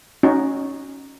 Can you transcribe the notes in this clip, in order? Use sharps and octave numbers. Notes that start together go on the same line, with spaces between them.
C#4 D#4 F#4